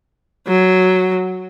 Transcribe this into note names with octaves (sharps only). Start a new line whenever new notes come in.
F#3